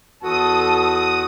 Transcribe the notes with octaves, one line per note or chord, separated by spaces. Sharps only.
E2 F#4 A4 D#6